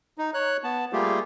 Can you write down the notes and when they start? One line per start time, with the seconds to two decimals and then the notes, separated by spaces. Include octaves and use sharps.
0.18 D#4
0.34 C#5 F#6
0.64 B3 A5
0.93 G3 A3 A#3 F4 G4 G#4